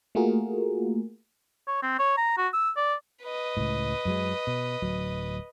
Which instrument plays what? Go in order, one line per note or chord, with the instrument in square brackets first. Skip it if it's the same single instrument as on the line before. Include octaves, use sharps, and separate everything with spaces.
[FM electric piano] A3 A#3 F4 F#4 G#4 A#4
[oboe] C#5
C4
C#5
A#5
F#4
E6
D5
[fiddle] B4 D#5
[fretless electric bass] C#2 A2
F#2 F#3 G#3
B2
D1 F#3